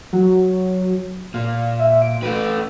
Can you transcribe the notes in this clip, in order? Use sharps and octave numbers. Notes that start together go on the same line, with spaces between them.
F#3
A#2 F5
E5
D7
A3 B4